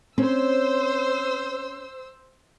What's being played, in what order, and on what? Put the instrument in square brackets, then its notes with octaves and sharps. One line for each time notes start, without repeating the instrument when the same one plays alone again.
[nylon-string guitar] C4 C#4 [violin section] C5 E6